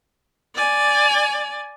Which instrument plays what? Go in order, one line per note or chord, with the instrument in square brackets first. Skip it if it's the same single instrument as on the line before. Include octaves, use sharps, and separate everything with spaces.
[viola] D5 G#5